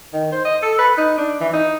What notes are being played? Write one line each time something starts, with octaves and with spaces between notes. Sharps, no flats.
D#3
C5
D#5
A4
B4
D#4
D4
E3
D#4